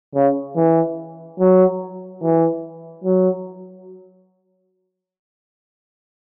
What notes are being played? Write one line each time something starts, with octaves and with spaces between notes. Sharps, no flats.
C#3
E3
F#3
E3
F#3